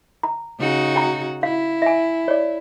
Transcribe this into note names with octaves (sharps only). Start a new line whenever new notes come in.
A#5
C#3 D#4 F#4
G5 A#5
E4 F5
E5 G#5
C#5 D5